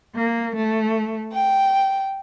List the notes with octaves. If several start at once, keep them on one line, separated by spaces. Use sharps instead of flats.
A#3
A3
G5